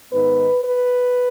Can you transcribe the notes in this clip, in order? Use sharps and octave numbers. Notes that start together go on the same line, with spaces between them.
G#2 D#3 B3 D#4 B4
B4